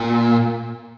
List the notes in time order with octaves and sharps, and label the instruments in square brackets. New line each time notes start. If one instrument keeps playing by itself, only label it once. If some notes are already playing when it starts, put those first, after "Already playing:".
Already playing: [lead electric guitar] A#2